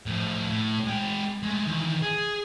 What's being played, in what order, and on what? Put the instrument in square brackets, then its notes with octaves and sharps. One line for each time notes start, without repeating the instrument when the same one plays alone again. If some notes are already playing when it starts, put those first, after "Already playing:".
[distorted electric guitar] A2 F3
A2
G#3 G5
G#3 A3
D#3 E3
G#4